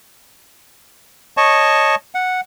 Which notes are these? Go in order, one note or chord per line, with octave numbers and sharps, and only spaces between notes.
C#5 D#5 A5 C#6
F#5